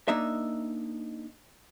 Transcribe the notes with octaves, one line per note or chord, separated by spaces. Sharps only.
A#3 D4 D#4 E5